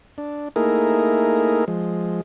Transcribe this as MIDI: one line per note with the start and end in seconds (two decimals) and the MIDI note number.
0.18 0.49 62
0.56 1.65 57
0.56 1.65 58
0.56 1.65 63
0.56 1.65 64
0.56 1.65 68
0.56 1.65 70
1.68 2.21 53
1.68 2.21 56